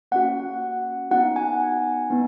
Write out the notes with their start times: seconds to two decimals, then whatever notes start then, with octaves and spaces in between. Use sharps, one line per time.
0.12 A#3 C#4 F#4 F#5
1.11 B3 D#4 F#4 F#5
1.36 G#5
2.10 B3 D#4